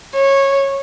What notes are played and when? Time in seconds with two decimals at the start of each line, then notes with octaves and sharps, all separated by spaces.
0.15 C#5